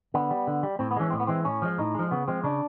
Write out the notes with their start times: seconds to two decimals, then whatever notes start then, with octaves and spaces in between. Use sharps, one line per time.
0.14 D3 B3
0.31 G3
0.47 D3
0.63 G3
0.79 A2 C4
0.91 B3
0.96 E3 G#3 C#4
1.10 A2 C4
1.20 B3
1.27 E3 G#3 C4
1.45 A2 C#4
1.62 F3 G#3
1.78 A2 D#4
1.95 F3 G#3
2.11 C#3 B3
2.27 F3 G#3 C4
2.44 C#3 D4